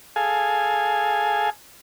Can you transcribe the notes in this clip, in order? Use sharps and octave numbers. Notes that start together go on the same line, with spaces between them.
G#4 A4 F5 G#5